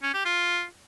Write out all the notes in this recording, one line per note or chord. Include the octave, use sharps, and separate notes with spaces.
C#4
G4
F4